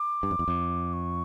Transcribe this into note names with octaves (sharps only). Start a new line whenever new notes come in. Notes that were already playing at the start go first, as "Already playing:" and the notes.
Already playing: D6
G2
F2
E2
F2
C#6